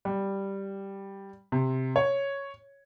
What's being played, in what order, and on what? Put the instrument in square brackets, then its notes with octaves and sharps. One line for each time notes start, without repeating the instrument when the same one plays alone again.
[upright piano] G3
C3
C#5